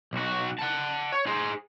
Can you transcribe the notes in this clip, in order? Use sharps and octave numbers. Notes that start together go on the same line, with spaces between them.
B1 F#4
F#5 A5
C#5
G#4 C5